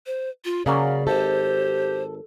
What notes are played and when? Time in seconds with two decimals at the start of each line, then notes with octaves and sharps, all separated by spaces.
0.06 C5
0.45 F4
0.66 C#3 F#3 A#3 C#4 A#4 D5
1.07 G#1 G4 A4 C5